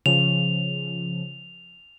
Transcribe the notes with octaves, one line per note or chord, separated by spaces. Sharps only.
C#3 F3 F7